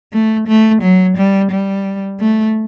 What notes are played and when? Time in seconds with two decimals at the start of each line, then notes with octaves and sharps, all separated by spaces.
0.13 A3
0.48 A3
0.82 F#3
1.17 G3
1.51 G3
2.20 A3